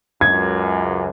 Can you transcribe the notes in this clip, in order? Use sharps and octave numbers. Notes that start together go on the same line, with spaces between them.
C#2 F#2 G#6